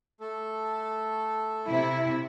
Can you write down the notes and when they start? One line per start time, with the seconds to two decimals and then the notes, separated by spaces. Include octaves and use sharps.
0.20 A3 A4
1.69 C3 E4